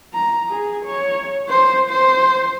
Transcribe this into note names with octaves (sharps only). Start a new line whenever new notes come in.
A#5
G#4
C#5
C5
C5